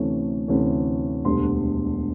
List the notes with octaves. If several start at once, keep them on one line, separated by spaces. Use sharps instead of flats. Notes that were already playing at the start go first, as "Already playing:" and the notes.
Already playing: D2 C3 E3 A3 C#4
D2 C3 E3 A3 C#4
E1 D2 D3 G3 C6